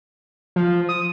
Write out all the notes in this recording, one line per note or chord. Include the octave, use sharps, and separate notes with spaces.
F3
D#6